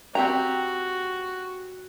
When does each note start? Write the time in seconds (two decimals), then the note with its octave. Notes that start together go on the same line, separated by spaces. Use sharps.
0.15 C4 F#4 G4 A#5